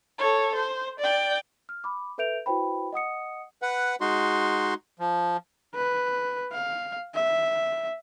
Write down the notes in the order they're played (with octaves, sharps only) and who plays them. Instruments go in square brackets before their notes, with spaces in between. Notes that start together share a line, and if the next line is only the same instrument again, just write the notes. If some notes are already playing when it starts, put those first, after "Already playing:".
[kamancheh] A4 C#5
C5
D5 G5
[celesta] F6
B5 D6
A4 B4 E5 G6 D7 F7
E4 F#4 B4 C5 G5 B5
D#5 F#5 D#6 C#7
[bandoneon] B4 F#5
G#3 D#4 F#4 C6
F3
[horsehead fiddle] B4
F5
E5